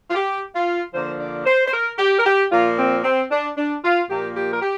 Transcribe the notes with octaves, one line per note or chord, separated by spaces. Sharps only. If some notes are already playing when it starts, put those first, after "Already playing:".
F4
G4
F4
D3 F3 A#3 C5
D5
C5
C5
A#4
G4
A#4
G4
A#2 F3 A#3 F4
C4
C4
D4
D4
F4
A#2 F3 A#3 G4
G4
A#4
G4